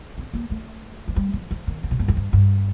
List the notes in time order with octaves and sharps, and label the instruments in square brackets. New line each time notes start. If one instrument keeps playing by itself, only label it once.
[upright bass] C4
A#3
A3
F3
G3
F3
F3
D#3
D3
C3
G2
F2
G2
G2